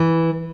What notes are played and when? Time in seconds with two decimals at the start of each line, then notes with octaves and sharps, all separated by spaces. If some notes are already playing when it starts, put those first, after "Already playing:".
Already playing: E3